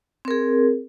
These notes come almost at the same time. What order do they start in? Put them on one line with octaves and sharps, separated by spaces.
C4 A#4 G#4